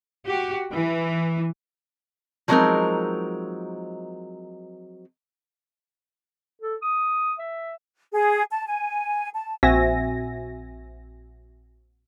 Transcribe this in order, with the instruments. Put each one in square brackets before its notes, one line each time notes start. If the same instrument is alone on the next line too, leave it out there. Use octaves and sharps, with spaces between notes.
[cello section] F#4 G4
E3
[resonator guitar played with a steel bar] F3 F#3 G#3 C4 D#4 A#4
[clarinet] A4
D#6
E5
[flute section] G#4
A5
G#5
A5
[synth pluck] A#1 C4 F#4 E5 G#5 A#6